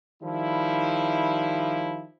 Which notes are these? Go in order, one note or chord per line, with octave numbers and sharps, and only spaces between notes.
D#3 F3 G3 E4